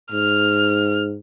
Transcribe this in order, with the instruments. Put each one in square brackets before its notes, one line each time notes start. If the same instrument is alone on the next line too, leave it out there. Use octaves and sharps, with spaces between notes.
[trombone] G#2 [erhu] F6